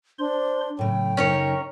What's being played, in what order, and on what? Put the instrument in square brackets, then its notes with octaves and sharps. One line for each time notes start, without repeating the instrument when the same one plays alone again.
[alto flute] D4 [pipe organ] C5 C6
[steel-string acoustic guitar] A2 C#3 [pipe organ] F#3 [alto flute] G5
[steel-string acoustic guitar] F#2 C#3 D#4 [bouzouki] C#4 A#4 C#5